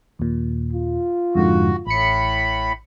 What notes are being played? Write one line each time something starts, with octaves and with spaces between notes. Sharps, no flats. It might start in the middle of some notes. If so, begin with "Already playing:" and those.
D#2 A#2
F4
F2 G#2 D3 F#4
A1 A2 B5 C#7